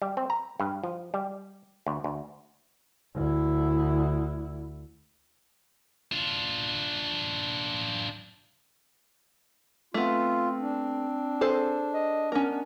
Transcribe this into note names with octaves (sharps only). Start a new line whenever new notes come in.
G3
C4
A#5
G2
F3
G3
D2
D2
D2 E4
D4 F4
A3 B3 C4 F4
D4
G#4 A4 C5
D#5
B3 C#4 A#4